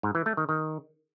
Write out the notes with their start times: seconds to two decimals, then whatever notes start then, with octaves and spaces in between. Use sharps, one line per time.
0.03 G#2
0.15 E3
0.26 A3
0.37 D#3
0.49 D#3